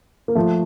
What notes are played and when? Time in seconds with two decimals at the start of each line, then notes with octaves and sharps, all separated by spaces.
0.28 A#3
0.35 F3 A3